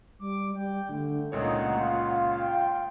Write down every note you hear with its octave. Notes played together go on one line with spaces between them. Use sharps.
G3 D6
G3 G5
D3 A3
C#2 A#2 D#4 C#5 F#5
F4 F5
G5